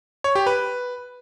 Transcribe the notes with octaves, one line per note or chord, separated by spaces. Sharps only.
C#5
G4
B4